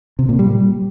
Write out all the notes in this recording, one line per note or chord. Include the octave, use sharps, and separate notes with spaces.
C3
A#2
G3